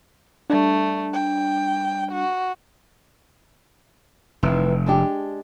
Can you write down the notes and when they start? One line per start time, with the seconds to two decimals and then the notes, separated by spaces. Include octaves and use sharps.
0.50 G3 A3 D4
1.14 G5
2.12 F#4
4.43 F1 D#3 E3
4.86 G#3 D4 G4